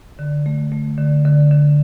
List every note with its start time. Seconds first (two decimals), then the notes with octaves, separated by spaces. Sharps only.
0.19 D3
0.46 A3
0.72 A3
0.98 D3
1.25 D3
1.51 D3